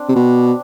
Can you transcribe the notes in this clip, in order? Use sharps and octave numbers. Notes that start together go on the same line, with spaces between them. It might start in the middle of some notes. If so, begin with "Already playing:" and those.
Already playing: C4 D4
C3
B2